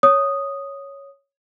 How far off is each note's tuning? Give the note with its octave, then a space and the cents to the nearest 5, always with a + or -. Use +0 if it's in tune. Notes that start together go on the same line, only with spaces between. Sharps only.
C#5 +0 D#6 -5